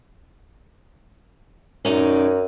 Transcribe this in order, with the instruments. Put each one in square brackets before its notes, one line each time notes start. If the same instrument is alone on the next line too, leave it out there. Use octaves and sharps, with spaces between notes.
[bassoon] F#2 [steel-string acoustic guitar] C#4 D#4 D5